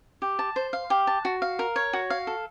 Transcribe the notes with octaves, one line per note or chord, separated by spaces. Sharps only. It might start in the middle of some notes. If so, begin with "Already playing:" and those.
G4
A5
C5
F5
G4
A5
F#4
F5
A#4
C#5
F#4
F5
A4